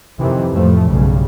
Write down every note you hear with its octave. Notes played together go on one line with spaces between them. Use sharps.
F2 C3 D#3 E3
F2 A2 F3 A3
B1 G2 C#3